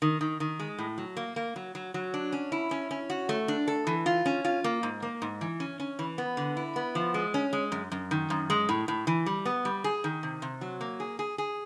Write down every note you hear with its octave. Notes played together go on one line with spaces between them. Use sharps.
D#3
D#3
D#3
G#3
A2
F#3
A#3
A#3
F#3
F#3
F#3
D4
C#4
E4
C#4
C#4
F#4
A3
D4
A4
E3
F4
C#4
F4
A#3
G#2
A#3
G#2
E3
C#4
C#4
E3
B3
D3
E4
B3
F3
G#3
C#4
G#3
F#2
F#2
D#3
F#2
G#3
A2
A2
E3
G3
B3
G3
G#4
D#3
C3
C3
F#3
A#3
G#4
G#4
G#4